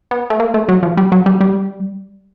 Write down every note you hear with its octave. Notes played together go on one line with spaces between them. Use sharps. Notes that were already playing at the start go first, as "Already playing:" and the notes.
B3
A3
A#3
A3
F#3
F3
G3
F#3
G3
G3